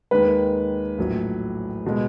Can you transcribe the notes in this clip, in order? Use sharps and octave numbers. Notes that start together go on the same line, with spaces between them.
D#2 D#3 G#3 B4
A#1 A2 F#3
B2 G#3